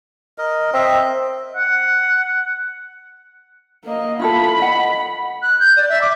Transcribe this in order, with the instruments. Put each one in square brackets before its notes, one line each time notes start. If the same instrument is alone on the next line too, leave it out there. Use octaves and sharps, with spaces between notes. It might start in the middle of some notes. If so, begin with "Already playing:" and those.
[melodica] A#4 D#5
[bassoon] C4 [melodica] D#5 E5
[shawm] F#5
[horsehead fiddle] A#3 D#5
[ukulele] E4 F4 A4 [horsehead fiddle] B5
[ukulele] D#5 F#5
[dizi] F#6
G6
D5
E5
D6